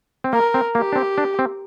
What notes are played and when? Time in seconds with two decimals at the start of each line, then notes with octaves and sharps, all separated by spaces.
0.24 C4
0.33 A#3 A#4
0.54 C4
0.75 A#3 G4
0.92 D4
0.96 C4
1.18 D4
1.39 C4